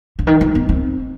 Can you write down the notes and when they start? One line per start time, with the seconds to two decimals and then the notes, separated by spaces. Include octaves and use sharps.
0.19 D3
0.27 D#3
0.41 F3
0.55 B3
0.69 C4